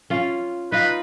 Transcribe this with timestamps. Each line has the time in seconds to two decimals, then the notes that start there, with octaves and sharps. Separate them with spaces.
0.10 C#4 F4
0.72 D#4 F4 B4